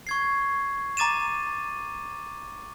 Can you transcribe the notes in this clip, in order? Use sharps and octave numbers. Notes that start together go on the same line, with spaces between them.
C#6 G#6 C7
A#5 D6 A6 D#7 E7